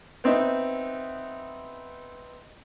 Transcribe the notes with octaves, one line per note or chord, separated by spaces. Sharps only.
B3 C4 D#4 E5